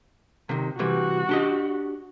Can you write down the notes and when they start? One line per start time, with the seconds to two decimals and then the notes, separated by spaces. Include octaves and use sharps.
0.49 C3 D#3
0.79 C3 E3 G3 F#4
1.29 D4 G4 D#5